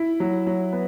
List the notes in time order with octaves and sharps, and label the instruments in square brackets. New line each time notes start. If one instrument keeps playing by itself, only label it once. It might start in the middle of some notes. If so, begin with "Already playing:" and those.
Already playing: [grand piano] E4
F#3
F#3
B3